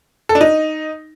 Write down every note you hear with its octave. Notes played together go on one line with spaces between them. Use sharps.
A4
D4
D#4